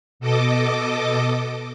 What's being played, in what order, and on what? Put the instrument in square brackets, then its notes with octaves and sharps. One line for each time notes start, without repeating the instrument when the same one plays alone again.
[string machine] B2 A4 D#5 D6